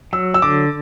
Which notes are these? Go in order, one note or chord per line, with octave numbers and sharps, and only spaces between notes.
F#3 E6
E6
D3 D6